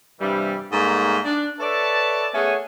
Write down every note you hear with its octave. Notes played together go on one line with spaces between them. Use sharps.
G2 C3 E3 G3
G#2 G3 A3 A#3
D4
A4 B4 C#5 D5 E5 A5
A3 B3 C#4 G#4 F#5 G#5